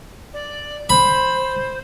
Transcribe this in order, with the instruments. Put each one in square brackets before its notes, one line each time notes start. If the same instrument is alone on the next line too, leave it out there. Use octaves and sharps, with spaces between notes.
[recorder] D5
[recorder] C5 [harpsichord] B5